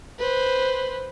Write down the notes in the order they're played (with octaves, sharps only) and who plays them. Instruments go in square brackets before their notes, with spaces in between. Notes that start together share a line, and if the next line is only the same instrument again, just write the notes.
[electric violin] B4 C5